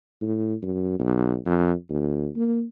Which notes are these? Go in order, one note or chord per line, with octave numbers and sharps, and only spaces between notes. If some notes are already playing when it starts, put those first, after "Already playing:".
A2
F#2
B1
F2
D2
A#3